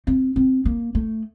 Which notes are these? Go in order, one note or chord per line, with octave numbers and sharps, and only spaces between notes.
C4
C4
A#3
A3